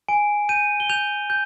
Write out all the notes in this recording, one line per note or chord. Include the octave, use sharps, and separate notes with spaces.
G#5 D7
G6 D#7
G7
G6 F7
G6